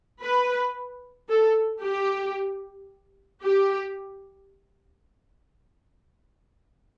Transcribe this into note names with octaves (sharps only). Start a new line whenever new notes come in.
B4
A4
G4
G4